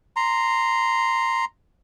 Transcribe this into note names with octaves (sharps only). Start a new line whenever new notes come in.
A#5 C6